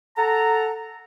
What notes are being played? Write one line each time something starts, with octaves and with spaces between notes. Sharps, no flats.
A4 F#5 A5 A#5